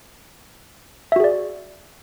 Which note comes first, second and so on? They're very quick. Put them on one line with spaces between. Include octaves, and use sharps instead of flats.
E5 F#4 G#4 D5